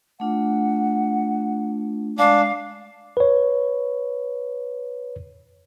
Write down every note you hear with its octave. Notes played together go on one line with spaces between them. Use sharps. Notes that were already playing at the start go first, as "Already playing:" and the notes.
A3 D4 F4 F#5
G#3 D4 F5
B4 C#5